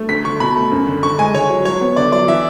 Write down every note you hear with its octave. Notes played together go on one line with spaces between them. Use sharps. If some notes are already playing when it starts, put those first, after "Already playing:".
Already playing: A3
D2 B6
D3 C#6
B2 B5
A3
F#2
D3
D3 C#6
G#3 G#5
D3 C#5
F#3
F#3 C#5
B3
D3 D5
F#3 D5
E3 E5